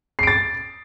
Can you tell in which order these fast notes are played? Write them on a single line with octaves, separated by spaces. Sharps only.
C7 D7 A6